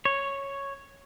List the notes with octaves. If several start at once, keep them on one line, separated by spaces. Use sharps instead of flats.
C#5